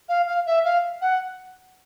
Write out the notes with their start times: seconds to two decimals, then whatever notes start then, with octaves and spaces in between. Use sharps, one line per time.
0.09 F5
0.27 F5
0.46 E5
0.65 F5
1.01 F#5